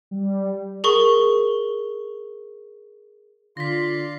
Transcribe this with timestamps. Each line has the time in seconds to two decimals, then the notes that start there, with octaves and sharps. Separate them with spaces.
0.11 G3
0.84 G#4 A#4 C#6
3.57 D3 F4 D5 F5 C6 A#6 B6